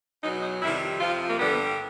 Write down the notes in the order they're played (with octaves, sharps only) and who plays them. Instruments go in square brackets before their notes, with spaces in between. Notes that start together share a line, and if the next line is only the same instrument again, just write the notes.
[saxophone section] E2 B2 F#3 D#4
D#4
F2 C3 D#3 G3 E4
F2 C3 F3 F4
A#3
G2 D3 G3 B3